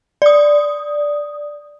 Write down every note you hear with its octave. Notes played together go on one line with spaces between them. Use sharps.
D5 D#6